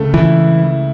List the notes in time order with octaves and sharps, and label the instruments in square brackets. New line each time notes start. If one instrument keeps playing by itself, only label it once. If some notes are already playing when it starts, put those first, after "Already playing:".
Already playing: [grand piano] C#2 C#3 A3
[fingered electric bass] E3 [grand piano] E4